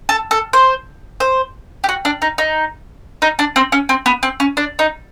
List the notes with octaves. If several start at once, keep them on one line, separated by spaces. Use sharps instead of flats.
A4
A4
C5
C5
G4
F#4
D4
D#4
D#4
D#4
D4
C4
C#4
C4
B3
C4
C#4
D4
D#4